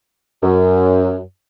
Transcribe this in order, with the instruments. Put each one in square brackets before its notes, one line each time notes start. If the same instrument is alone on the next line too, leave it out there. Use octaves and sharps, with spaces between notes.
[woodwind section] F#2